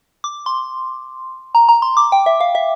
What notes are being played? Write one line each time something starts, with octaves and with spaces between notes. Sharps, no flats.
D6
C6
A#5
A#5
C6
D6
G5
E5
F5
E5